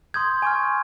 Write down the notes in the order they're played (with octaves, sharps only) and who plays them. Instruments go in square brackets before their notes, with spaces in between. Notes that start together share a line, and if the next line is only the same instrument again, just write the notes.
[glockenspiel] C6 D#6 G6 G#6
G#5 C#6 F6